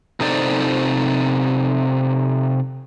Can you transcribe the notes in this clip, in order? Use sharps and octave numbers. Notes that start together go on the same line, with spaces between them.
C3 D#4 A4 C5 D5